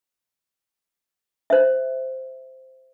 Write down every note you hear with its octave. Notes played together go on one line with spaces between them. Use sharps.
C5 E5